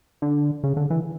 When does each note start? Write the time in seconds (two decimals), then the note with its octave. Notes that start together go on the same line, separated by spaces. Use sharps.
0.22 D3
0.64 C#3
0.77 D3
0.90 E3